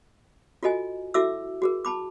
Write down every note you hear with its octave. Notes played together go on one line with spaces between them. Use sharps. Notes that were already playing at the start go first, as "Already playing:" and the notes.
F4 F#4 A4 D#5 G#5
E4 F#4 A4 E5 D6 E6
F#4 G#4 A#4
A5 B5 D6